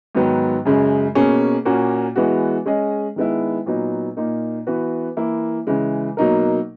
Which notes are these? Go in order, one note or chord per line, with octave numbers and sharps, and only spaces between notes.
G#2 D#3 F#3 B3
F#2 C#3 G#3
B2 A#3 C#4 G#4
A#2 A#3 C#4 F#4
E3 G#3 B3 F#4
G#3 C#4 G#4 D#5
D#3 G#3 B3 E4
A#2 F#3 B3 D#4
A#2 A#3 D#4
E3 B3 F#4 B4
E3 A#3 E4
C#3 E3 G#3
B2 F#3 A#3 D#4 A#4